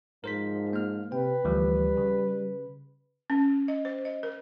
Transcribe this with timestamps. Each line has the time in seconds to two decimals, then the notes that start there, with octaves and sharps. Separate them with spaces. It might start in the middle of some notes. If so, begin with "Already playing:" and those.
0.24 G#2 F3 A#4 C5 B6
0.73 A#3 F6
1.12 C3 B4 G5
1.45 D2 E3 F3 G3
1.97 C#3
3.30 C#4
3.68 D#5
3.85 C5
4.05 D#5
4.23 A#4